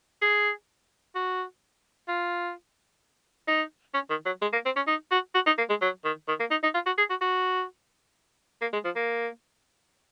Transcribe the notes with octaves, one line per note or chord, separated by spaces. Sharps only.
G#4
F#4
F4
D#4
C#4
D#3
F#3
G#3
A#3
C4
C#4
D#4
F#4
F#4
D#4
A#3
G#3
F#3
D#3
D#3
A#3
D#4
D#4
F4
F#4
G#4
F#4
F#4
A#3
G#3
F3
A#3